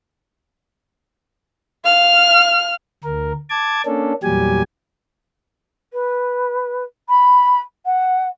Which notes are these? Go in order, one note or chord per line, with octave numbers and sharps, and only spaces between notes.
F5 F6
D2 A#4
A5 D6 G#6
A#3 C#4 D4 A4
E2 A#2 F#3 G3 G4 G#5
B4
B5
F#5